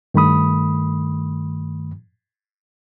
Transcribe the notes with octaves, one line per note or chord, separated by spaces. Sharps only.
G2 D#3 A3 B5 D#6